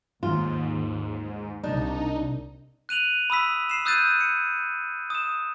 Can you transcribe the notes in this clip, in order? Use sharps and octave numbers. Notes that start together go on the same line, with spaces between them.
D#2 G#2 F4
C2 D4 D#4
F#6 D#7 F7 F#7
B5 D#6 E6 B6
C7 E7
D#6 E6 F#6 G6 A6 D#7
C#7
D#6 E7